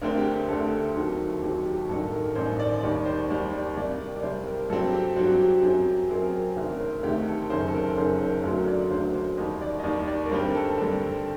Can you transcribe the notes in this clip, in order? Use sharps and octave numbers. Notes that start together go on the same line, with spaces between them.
D2 D3 A3 C4 A#4
G4
G4
D2 D3 A3 C4 A4
D#2 D#3 F#3 C4
D#2 D#3 F#3 C4 G4
G4
A1 G2 D#3 A4
A#4
A1 G2 D#3 C5
D5
D#2 D#3 G3 D5
D5
C5
D5
D#2 D#3 G3 D5
D5
C2 C3 G3 A#3 D5
A#4
D5
C2 C3 G3 A#3 C5
A#4
G2 F#3 C4 A4
G4
G2 F#3 C4 F#4
G4
F#2 F#3 C4
F#2 F#3 C4 A#4
D2 C3 D#3 A3 A#4
A#4
C5
D2 C3 D#3 A3 G4
A4
F#1 F#2 D#3 C5
A4
A#4
F#1 F#2 D#3 C5
C5
D2 D3 F#3 A#3 A#4
D5
D2 D3 F#3 A#3 C5
C5
D#2 D#3 G3 D#5
D5
D#5
D#2 D#3 G3 D5
D5
A#4
G2 D3 G3 C4 C5
A#4
A4
G4
G2 D3 G3 C4 G4
A4